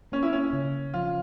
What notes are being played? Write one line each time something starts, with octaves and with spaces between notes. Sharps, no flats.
A#3 C#4
E4
C#4
C#3
F3 F4